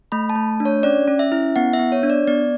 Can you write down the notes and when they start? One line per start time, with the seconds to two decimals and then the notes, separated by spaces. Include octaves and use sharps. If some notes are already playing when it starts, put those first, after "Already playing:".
0.12 A3 B5
0.30 A5
0.35 A3
0.60 D4
0.65 C#5
0.83 C#4 D5
1.08 C#4
1.19 E5
1.32 E4
1.56 B3 F#5
1.73 E5
1.79 B3
1.92 C#5
2.03 D4
2.10 D5
2.27 B3 D5